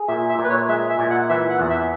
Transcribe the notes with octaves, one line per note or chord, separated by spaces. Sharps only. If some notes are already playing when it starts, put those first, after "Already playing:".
Already playing: G#4
A#2 E5
E5
A#2
B4
C#5
G#3 E5
E5
A#2
F#5
E3 E5
F#5
E2
E5